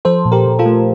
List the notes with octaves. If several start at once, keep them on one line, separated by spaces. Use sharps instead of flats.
F3 A4 C5
A#2
G4 A#4
A#2
F4 A4
A3